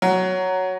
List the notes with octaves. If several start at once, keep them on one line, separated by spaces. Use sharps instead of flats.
F#3